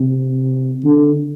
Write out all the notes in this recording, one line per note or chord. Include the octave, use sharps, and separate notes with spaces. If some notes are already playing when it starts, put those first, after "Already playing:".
Already playing: C3
D3